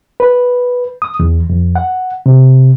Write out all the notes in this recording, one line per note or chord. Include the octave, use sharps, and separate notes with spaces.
B4
D#6
E2
F2
F#5
C3